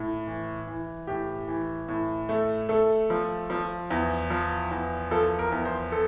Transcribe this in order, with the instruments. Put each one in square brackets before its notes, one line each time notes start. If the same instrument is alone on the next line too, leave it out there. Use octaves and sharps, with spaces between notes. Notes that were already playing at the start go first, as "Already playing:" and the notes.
Already playing: [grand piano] A2
E3
E3
A2 G4
E3
A2
A3
A3 A4
F3
F3
E2
F3
E2
F3 A4
A#4
E2
C5
A4